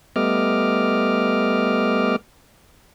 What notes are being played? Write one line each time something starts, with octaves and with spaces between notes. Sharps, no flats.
G3 A3 B3 D#5 D6 F6